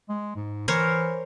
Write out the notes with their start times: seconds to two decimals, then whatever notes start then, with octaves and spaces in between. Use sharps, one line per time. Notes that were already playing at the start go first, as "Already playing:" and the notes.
0.09 G#3
0.36 G#2
0.68 E3 A#4 C5 C#5